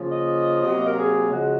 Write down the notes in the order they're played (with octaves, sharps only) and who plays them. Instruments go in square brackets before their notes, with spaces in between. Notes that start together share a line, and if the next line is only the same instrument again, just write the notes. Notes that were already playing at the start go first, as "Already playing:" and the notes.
Already playing: [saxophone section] C#3 F3 A#3
D#5
C3 F#3 A#3
A#4
G#4
C#3 F3 G#3 F#4